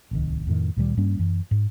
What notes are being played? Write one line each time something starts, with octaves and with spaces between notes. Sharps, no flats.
D1 C2 D#3
F2 A2 D#3
D2 A#2 D#3 G3
G2 G3 A#3 C#4
F#2 E3
G#2